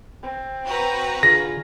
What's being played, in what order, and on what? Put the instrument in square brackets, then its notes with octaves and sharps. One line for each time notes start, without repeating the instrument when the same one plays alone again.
[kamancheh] C4
[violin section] F#4 B4 A#5
[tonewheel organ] D3 G#4 [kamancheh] F4 [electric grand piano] A#6